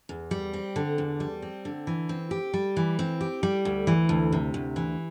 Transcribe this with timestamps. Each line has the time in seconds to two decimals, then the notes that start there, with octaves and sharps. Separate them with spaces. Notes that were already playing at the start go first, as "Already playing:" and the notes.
0.09 E2
0.31 G3
0.53 C4
0.76 D3
0.98 E2
1.20 G3
1.42 C4
1.65 D3
1.87 E3
2.09 C4
2.31 G4
2.54 G3
2.77 E3
2.99 C4
3.21 G4
3.43 G3
3.65 D2
3.87 E3
4.09 D2
4.32 C3
4.54 D2
4.76 E3